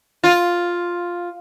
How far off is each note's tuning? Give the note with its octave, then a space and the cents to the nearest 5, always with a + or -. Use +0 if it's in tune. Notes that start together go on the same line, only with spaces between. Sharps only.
F4 +5